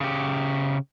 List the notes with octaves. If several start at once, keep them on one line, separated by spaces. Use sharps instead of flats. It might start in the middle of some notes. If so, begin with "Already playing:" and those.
C#3 G4